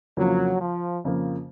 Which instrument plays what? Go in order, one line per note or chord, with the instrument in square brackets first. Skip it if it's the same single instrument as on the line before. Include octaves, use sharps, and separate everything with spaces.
[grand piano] F2 C#3 F3 A#3 [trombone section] F#3
[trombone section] F3
[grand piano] F2 C#3 F3 A#3